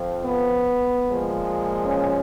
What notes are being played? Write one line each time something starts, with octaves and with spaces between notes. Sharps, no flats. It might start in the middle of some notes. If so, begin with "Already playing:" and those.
Already playing: F2 F3
B3
A#2 F3 G#3
C#4